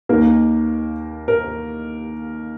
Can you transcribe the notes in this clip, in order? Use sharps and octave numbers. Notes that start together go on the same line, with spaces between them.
D#2 D#3 A#3 A#4
A#4